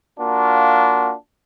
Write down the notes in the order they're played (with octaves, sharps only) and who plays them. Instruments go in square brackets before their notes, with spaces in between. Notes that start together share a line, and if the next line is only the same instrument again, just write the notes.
[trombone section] A#3 D4 F4 F#4